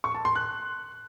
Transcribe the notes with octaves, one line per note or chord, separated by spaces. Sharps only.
C#6
A5
C6
F#6